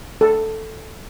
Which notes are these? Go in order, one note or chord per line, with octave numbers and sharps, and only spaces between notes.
A4